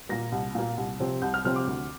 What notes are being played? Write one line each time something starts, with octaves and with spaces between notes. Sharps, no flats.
A#2 A#3 A#6
C2
A#2 A#3
C2
C3 F3 C4
C2 G6
F6
C3 F3 C4 F6
D6
D2